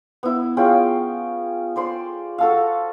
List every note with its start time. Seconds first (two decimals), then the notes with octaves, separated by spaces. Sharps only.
0.23 B3 E4
0.57 C#4 F4 G#4 G5
1.76 C5 D5 C6
2.38 F#4 A4 F5